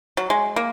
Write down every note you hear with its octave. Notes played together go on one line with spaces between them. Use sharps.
F#3
G#3
A#3